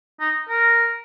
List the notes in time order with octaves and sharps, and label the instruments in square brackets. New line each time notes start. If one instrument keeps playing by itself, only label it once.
[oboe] D#4
A#4